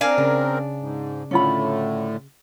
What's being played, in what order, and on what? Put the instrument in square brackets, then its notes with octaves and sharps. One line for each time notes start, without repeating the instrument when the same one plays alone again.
[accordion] C4 A#4 [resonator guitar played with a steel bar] D4 F5 G#5
[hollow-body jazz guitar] C#3
[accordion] G#2
[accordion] A2 D3 A3 [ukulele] C#4 F4 B5